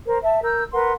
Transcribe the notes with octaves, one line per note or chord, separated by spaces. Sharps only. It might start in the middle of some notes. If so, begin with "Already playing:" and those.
A#4 C5
E5 A5
A#4 E6 G6
A#4 B4 F#5 C6